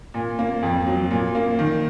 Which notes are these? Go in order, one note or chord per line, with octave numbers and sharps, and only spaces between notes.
A#2
A#3
F2
F#3
A#2
A#3
D#3